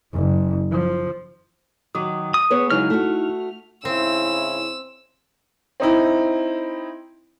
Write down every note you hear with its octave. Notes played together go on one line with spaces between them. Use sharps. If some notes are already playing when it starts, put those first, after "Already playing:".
F#1
F3
D#3 F#3 F#4 D6 D#6
D#6
B3 G#4 B4 C#5
C#3 F#3 G#3 D#4 E4 F6
A3 F#4
G#2 C#3 C4 E4 E6
C4 D#4 E4